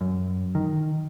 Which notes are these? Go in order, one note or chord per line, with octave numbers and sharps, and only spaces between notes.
F#2
D#3